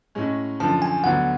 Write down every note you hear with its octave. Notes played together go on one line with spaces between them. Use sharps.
A2 G#3 C#4
F#2 D3 F3 A5
G#5
D2 D3 F#3 B3 F#5